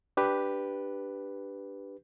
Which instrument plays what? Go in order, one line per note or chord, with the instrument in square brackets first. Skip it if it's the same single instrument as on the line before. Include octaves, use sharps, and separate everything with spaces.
[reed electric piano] D4 G4 B4